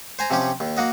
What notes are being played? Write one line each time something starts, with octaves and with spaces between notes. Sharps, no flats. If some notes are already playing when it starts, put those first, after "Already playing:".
C5 G#5 A#5
C3 F3 C#4 G4
D#2
A#3 F#4 D#5